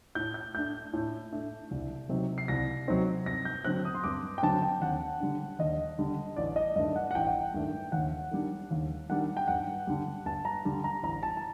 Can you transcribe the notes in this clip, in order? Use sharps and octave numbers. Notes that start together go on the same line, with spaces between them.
A2 G6
G6
A3 D4 G6
A2
A3 D4
C2
C3 F#3 C4 D#4
C7
C2 A#6
C3 F#3 C4 D#4
G2 A#6
G6
D3 F#3 C4 F#6
D#6
C6
G2 D6
G5
D3 F#3 C4 A5
G5
D#2 F#5
D3 G3 D4
D#2 D#5
D3 G3 D4
A1 D5
D#5
G2 D#3 A3 D4 D#5
F#5
F#5
A1 G5
G2 D#3 A3 D4
D#2 F#5
D#3 G3 D4
D#2
D#3 G3 D4 F#5
G5
G2 F#5
D3 G3
G2 A5
A#5
D3 G3
A#5
A1 A#5
A5
A5